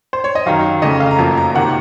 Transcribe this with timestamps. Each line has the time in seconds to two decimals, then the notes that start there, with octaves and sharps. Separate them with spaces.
0.13 C5
0.24 C#5
0.35 D#5
0.46 F#2 D#3 F#3 F5
0.82 F2 C#3 A3 D#5
1.00 F5
1.11 A#5
1.19 F#2 F3 A#3 A5
1.37 A#5
1.55 C3 D#3 A#3 F#5